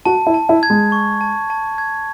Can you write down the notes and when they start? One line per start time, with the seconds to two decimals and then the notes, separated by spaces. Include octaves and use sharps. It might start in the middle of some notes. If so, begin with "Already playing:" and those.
0.05 F#4 A5
0.27 E4
0.34 A5
0.49 E4
0.63 G#6
0.70 G#3
0.92 C#6
1.21 A5
1.50 A5
1.78 G#6